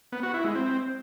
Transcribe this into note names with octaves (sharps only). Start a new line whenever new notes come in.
B3
F#4
E4
G#3
C4